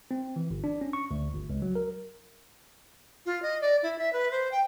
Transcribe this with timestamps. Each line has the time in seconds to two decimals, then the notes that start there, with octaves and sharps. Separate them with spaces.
0.11 C4
0.36 E3
0.50 G1
0.64 D4
0.81 C#4
0.93 C#6
1.11 D2
1.34 G1
1.50 C#2
1.62 F#3
1.76 A#4
3.26 F4
3.42 D#5
3.61 D5
3.83 E4
3.99 E5
4.13 B4
4.31 C5
4.52 G5